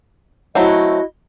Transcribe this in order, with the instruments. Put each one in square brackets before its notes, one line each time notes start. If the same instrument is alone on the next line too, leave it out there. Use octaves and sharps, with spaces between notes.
[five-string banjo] F#3 A3 C4 [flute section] E4 F#4 D#5